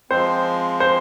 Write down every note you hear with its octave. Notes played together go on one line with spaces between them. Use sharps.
F3 G#3 C4 C5
C5